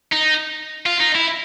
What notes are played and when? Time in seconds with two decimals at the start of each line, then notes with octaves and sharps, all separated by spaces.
0.12 D#4
0.86 F4
1.00 D#4
1.15 E4